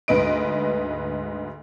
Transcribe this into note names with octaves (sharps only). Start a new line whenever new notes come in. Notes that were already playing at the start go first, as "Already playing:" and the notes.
D2 G#2 B4 D#5 D7